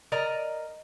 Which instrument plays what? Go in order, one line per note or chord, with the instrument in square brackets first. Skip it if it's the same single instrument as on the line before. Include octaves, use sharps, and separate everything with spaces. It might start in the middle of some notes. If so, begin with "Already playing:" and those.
[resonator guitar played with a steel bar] A#4 D5 D#5 A#5